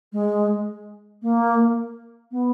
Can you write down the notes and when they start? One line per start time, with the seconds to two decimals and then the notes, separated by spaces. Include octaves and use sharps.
0.13 G#3
1.22 A#3
2.31 B3